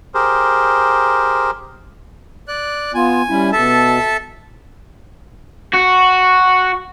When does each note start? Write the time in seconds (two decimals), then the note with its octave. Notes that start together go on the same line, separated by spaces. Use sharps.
0.14 G4 G#4 A#4 C5
2.48 D5 F#6
2.94 B3 F4 G#5
3.29 G3 C#4 E4
3.52 B2 A4 E5 A5
5.73 F#4